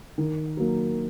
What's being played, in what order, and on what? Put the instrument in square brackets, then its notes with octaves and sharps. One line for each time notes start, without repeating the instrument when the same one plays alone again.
[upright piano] D#3
F#3 A#3